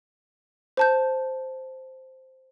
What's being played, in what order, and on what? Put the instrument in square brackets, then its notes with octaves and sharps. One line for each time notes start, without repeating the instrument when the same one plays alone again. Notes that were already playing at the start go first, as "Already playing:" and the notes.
[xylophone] C5 A5 G6